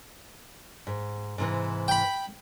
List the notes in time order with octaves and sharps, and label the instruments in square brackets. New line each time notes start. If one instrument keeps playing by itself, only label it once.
[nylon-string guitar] G#2
G#2 C3 E3
[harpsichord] G5 B5